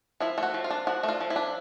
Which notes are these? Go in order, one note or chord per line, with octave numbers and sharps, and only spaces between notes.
F3 E4
A3 F#4
F3
F4
D4
F3 F#4
A3
F4
F3
E4
D4